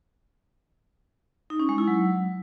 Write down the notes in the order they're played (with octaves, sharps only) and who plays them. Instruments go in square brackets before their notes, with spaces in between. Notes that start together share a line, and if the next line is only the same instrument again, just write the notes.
[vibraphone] D#4
C#4
G#3
E4
F#3